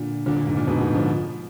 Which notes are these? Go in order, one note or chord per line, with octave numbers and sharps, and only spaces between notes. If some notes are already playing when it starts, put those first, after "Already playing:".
Already playing: A#2 D3
A#2 D3
A#2
G#2
A#2
G#2 B2
G#2
D3 F3